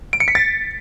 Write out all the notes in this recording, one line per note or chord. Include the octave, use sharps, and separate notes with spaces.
D7
C#7
B6
A6